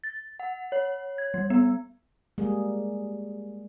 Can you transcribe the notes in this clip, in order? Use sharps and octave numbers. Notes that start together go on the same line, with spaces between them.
A6
F#5
C#5
G#6
G3
B3
G3 G#3 A#3 G#4